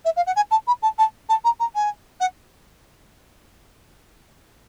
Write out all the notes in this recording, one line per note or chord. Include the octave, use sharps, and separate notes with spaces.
E5
F5
F#5
G#5
A5
B5
A5
A5
A5
A#5
A#5
G#5
F#5